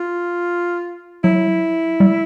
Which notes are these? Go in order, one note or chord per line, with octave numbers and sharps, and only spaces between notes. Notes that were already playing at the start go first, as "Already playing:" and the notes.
Already playing: F4
F#3 E4
G3